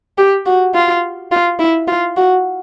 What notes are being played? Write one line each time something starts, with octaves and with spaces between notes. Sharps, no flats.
G4
F#4
F4
F4
E4
F4
F#4